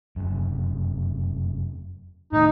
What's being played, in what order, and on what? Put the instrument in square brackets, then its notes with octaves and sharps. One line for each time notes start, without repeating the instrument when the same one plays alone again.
[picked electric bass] F1 F#2
[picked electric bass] A2 D#3 [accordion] D#4